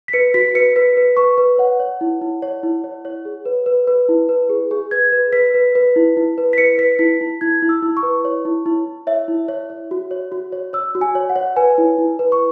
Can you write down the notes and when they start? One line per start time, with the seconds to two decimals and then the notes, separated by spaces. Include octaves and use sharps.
0.08 B6
0.13 B4 C#7
0.34 F#4 B6
0.55 B4 C#7
0.76 B4 B6
0.97 B4
1.17 B4 C#6
1.38 B4
1.58 C#5 F#5
1.80 C#5
2.01 E4
2.21 E4
2.42 C#5
2.63 E4
2.84 C#5
3.05 C#5
3.25 G#4
3.45 B4
3.66 B4
3.87 B4
4.09 E4
4.29 B4
4.49 G#4
4.71 G#4
4.91 B4 G#6
5.12 B4
5.33 B4 B6
5.54 B4
5.75 B4
5.96 E4
6.17 E4
6.38 B4
6.53 B6
6.58 B4 C#7
6.78 B4 B6
6.99 E4 B6
7.21 E4
7.41 E4 G#6
7.62 E4
7.69 E6
7.82 E4
7.97 C#6
8.03 B4
8.25 C#5
8.45 E4
8.66 E4
8.87 E4
9.07 C#5 E5
9.28 E4
9.48 C#5
9.70 C#5
9.91 F#4
10.11 C#5
10.32 F#4
10.52 C#5
10.73 C#5 E6
10.95 F#4
11.01 G#5
11.15 C#5
11.29 F#5
11.36 C#5
11.56 B4 G#5
11.78 E4
11.98 E4
12.19 B4
12.32 C#6